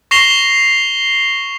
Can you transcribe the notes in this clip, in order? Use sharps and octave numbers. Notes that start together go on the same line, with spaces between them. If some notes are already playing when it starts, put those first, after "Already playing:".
C#6 A#6 C7 E7 F7 G7